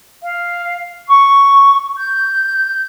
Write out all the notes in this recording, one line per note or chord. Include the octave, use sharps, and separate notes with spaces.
F5
C#6
G6